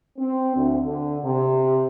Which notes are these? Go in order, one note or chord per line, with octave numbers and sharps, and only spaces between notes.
C4
D2
D3
C3